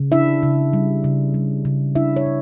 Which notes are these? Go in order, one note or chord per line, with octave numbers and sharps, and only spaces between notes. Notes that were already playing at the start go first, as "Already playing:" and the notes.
Already playing: C#3
D4 E4 E5
C#3
G3
C#3
G3
C#3
D4 E4 E5
C#5
C#3